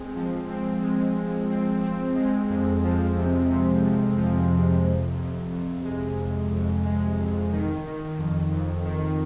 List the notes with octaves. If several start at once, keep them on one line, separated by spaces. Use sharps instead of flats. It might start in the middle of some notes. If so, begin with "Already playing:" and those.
Already playing: G#3 C4
F3
C4
G#3
G#3
C4
C4
G#3
F2
F3
C3
C3
F3
F3
C3
F2
F2
F2
G#3
F2
F2
G#3
F2
D#3
D#3
F2
F2
D#3